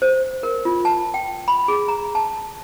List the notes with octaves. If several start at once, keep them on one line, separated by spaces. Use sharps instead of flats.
C5
A#4
F4
A5
G5
B5
G#4
A#5
A5